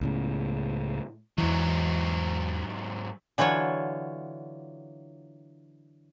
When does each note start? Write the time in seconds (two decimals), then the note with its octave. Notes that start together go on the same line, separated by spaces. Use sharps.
0.01 C#2 A2 C#3
1.38 E2 G#2 E3 F#3
3.38 D3 E3 F#3 F4 C#5